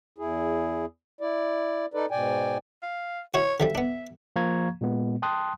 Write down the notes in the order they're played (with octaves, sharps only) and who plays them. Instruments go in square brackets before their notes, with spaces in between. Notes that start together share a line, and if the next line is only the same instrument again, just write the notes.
[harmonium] E2 E4 G#4
E4 D5
D#4 A4 B4 D5
G#2 B2 D5 G5 G#5
[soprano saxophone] F5
[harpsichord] E4 F#4 [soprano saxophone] C#5
[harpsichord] D3 F3 G3 [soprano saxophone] E5
[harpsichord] B3 D4
[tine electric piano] F3 A#3 F5 A#5 C#6 G#6
A#2 G#3 B3
G5 A5 C6 D#6 F#6